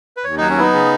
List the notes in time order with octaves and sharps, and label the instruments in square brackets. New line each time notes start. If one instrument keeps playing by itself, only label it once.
[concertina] B4
[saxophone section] D#2 [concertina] C#5
[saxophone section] F#3 [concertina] D#4
[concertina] C#4
[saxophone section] B3 [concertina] D#4 E4
[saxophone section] C#3